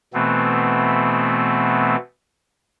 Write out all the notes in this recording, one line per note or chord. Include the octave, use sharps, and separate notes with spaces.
B2 E3 A3 B3 C4